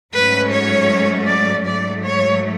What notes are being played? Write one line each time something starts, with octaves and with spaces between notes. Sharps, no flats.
G#2 F#3 A3 C#4 B4
C#5
D5
G#2 F#3 A3 D5
C#5